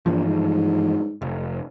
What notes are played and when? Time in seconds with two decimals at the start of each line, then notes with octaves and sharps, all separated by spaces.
0.06 A#1 G2 E3 F3
0.26 G#2
1.22 F1